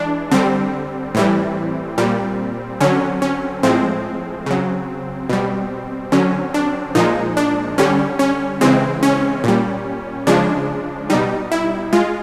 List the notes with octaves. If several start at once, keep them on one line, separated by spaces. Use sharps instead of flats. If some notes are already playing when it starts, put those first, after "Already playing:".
Already playing: E3 G#3 D4
D3 G3 C4
A2 E3 G3
A#2 G3
D3 F#3 C#4
C#4
A2 F3 G#3 C4
C#3 F#3
B2 G3
D3 F#3 C#4
D4
A#2 F3 G#3 D#4
D4
D3 G3 C#4
C#4
C#3 E3 G#3 C4
C#4
A#2 G3
C#3 F3 G#3 D4
B2 G3 D#4
E4
G#3 F4